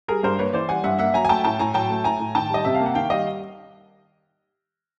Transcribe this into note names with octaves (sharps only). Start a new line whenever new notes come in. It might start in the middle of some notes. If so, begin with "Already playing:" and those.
G3 G#4 A#4
G2 A#4 C5
A#3 B4 C#5
E3 C5 D5
G3 F#5 G#5
G2 E5 F#5
A#3 E5 F#5
F#3 G#5 A#5
G#5
A3 G5 A5
A2 G5 A5
A2 G#5 A#5
F#3 G5 A5
A3
A2 G#5 A#5
A2
D#3 G5 A5
G3 D#5
C3 E5
F5
A#3
F#5
D#3 F5 G5
G3 D#5 F5